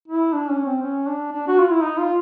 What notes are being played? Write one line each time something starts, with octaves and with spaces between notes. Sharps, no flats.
E4
D4
C#4
C4
C#4
D4
D4
F#4
F4
E4
D#4
F4